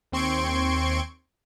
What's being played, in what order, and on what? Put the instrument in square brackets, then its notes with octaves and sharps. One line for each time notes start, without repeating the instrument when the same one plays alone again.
[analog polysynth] D#2 C4 C6 C#6 G#6 D7